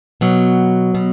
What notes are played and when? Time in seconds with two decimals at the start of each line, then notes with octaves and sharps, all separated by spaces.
0.21 B2 F#3
0.94 B2